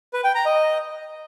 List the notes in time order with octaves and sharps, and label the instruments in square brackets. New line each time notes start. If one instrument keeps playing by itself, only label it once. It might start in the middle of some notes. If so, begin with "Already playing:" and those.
[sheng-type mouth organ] B4
G5
A#5
D#5